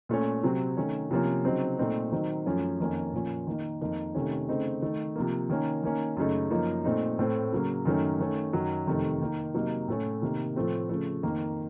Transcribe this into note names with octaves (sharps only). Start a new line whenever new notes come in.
A#2 A3 C#4
C3 F#3 C4
D#3 A3 C#4
C3 F3 A#3 C#4
C#3 F#3 C4 D#4
A#2 A3 C4 D#4
D#3 F#3 C4 D#4
F#2 F3 A3 C#4
F2 D#3 A#3 C#4
A#2 F3 A#3 C#4
D#3 A#3 D#4
F2 D#3 A#3 D#4
C3 D#3 A3 C#4
C#3 A3 C4 D#4
D#3 A3 D#4
C3 F3 A#3
D#3 A#3 C#4
D#3 A#3 C#4
F#2 C#3 A3 D#4
F#2 F3 A#3 D#4
A#2 A3 C4 D#4
A2 A3 C4
C#3 F#3 A#3
F#2 D#3 A3 C#4
D#3 A3 C#4
F#2 D#3 F#3
F2 C3 D#3 A3
D#3 A#3 D#4
C3 F#3 A#3 D#4
A2 A3 C#4
C3 D#3 A#3
A2 F3 A3 C4
C#3 F3 A3
F2 D#3 A#3